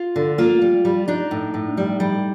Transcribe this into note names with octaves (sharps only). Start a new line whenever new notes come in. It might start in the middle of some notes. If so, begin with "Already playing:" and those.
Already playing: F4
D3
A#3 F4
G3
G3
D4 D#4
A2
A2
G3
G3